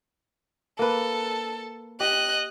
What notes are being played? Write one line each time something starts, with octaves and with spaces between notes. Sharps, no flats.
A#3 A4 B4
G4 D#5 F#6